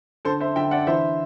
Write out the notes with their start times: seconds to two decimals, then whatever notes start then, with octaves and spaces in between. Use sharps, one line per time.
0.25 D3 A4 C5
0.41 C5 E5
0.56 D3 E5 G5
0.71 D5 F#5
0.87 E3 C5 E5